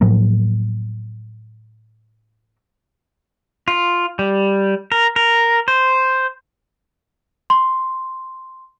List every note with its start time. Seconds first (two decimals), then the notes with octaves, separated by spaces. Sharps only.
0.01 A2 F3 F#3 A#3
3.68 F4
4.19 G3
4.92 A#4
5.16 A#4
5.68 C5
7.50 C6